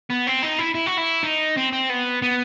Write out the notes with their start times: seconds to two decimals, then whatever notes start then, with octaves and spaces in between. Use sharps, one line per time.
0.10 B3
0.27 C4
0.42 D#4
0.58 E4
0.75 E4
0.87 F#4
0.98 E4
1.24 D#4
1.57 C4
1.73 C4
1.90 B3
2.22 B3